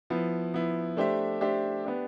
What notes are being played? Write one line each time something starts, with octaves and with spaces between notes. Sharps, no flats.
F3 B3 E4
F3 B3 E4
A3 D4 G4 C5 E5
A3 D4 G4 C5 E5
B3 D4 G4